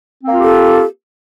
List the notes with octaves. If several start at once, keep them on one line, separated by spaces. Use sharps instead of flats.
A#3 C4 F4 G4 A4